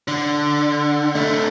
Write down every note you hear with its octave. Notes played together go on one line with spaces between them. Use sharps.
D3
A3 D#4